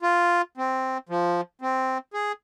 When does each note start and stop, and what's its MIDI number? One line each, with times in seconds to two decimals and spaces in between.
0.02 0.42 65
0.58 0.98 60
1.09 1.41 53
1.62 1.98 60
2.14 2.32 68